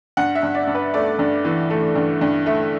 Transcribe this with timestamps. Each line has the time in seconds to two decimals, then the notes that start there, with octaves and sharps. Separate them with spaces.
0.17 G2 F#5
0.35 E5
0.43 G2
0.55 D5
0.67 G2
0.75 B4
0.94 A3 D5
1.19 G2
1.45 E3
1.70 A3
1.95 G2
2.21 G2
2.46 A3 E5